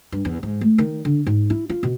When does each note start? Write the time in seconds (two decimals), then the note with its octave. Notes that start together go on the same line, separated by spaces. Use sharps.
0.12 G2
0.25 E2
0.43 G#2
0.61 A3
0.78 D#3
1.05 D3
1.26 G#2
1.50 E4
1.69 F4
1.83 B2